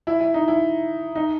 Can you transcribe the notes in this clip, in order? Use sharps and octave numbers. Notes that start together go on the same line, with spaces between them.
E4
E4
D#4
E4
D#4